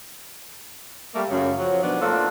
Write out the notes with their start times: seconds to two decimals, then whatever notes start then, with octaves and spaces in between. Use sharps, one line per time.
1.15 G3 A3 A#3
1.30 F#2 C#3
1.58 F3 F#3
1.82 B2 D#3 F3 B3 D4
2.01 A3 A#3 C4 D4 F4 A4